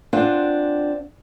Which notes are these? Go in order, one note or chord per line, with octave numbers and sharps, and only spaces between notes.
C4 D4 F4 F#5